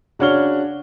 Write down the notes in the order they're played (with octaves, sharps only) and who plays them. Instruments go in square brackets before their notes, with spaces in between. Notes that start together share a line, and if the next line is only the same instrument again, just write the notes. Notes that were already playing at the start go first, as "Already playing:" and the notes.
[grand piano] C#3 D4 F#4 C#5 F6 G7